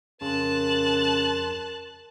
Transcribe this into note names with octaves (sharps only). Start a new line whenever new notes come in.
F2 C#3 A#4 A5 C6 F#6